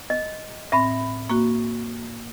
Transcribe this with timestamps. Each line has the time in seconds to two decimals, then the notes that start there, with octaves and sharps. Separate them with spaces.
0.10 D#5
0.72 A2 C4 E5 B5
1.29 A#3 F#4 C#6